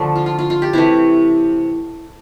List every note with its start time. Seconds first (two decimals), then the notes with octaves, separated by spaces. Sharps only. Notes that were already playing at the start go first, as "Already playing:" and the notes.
Already playing: D3 F3 A3 D4
0.16 F4
0.26 F4
0.39 F4
0.50 F4
0.62 G4
0.73 C3 E3 A3 E4